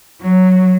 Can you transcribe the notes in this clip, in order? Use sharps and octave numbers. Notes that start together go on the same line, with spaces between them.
F#3